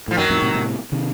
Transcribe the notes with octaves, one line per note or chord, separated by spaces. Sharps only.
A2 F3
F#2 D#3 F#3
F2 A2
A2 C3
A2 C3
C3 D#3